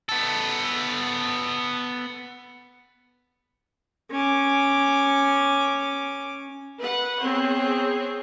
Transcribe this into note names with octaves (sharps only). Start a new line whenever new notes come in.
B3 A4
C#4 D6
B4 F#5
B3 C4 G#4 C#5